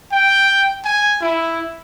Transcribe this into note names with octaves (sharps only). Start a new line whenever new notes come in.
G5
G#5
E4